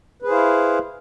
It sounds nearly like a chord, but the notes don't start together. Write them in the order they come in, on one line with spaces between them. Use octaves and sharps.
B4 G#4 C5 E4 F5